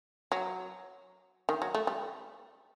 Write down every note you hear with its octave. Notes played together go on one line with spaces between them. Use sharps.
F#3
D#3
F#3
A3
G3